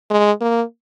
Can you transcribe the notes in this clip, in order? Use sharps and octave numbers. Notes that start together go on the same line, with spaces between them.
G#3
A#3